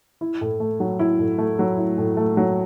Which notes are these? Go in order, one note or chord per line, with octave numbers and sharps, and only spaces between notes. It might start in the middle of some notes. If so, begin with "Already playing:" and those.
E4
A2
A3
F#3
E4
A2
A3
F#3
E4
A2
A3
F#3